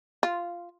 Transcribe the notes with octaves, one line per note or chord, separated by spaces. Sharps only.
F4